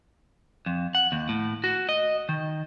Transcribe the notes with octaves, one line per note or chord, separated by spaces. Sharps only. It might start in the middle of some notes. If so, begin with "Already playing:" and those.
F2
F#5
D#2
A2
F#4
D#5
D#3